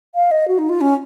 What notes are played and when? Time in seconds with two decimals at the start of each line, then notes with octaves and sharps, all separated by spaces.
0.15 F5
0.31 D#5
0.48 F#4
0.58 D#4
0.69 F4
0.81 C#4